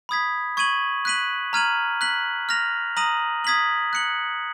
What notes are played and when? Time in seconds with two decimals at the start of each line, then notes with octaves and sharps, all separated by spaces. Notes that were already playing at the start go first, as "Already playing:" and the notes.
0.09 B5 D#6 G#6 B6
0.57 C#6 G#6 D#7 F#7
1.05 F#6 B6 D#7 F#7
1.53 A#5 F6 G#6 D#7 F#7
2.01 F#6 B6 F#7
2.49 F6 A#6 F7
2.97 A#5 D#6 A#6 D#7 F#7
3.44 D#6 G#6 B6 F#7
3.93 F#6 C#7 F#7